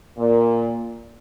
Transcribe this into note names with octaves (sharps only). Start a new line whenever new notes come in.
A#2